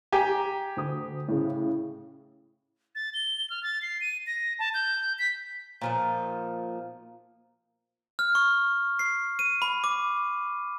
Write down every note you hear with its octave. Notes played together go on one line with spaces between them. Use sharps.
G4 G#5 A#5
D2 D#6
A2 C#3
A6
G7
F6
A6
C7
D#7
A#6
A5
G6
B6
A#2 F3 D#4
F6
C#6
C7
D#7
B5
D6